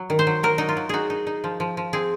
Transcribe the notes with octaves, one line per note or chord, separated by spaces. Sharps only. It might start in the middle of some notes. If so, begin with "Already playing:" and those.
Already playing: F#3
D#3
C5
F#3
F#3 A#4
F#3 D#4
F4
F#3
D#4 F#4 G#4
D#4
D#4
F3
F3
F3
C4 G#4